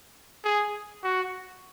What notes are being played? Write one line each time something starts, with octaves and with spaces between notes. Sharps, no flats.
G#4
F#4